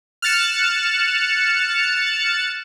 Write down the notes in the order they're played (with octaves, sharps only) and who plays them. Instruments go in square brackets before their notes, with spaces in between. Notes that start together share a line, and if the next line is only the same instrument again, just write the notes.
[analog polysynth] F6 F#6 A6 C#7 E7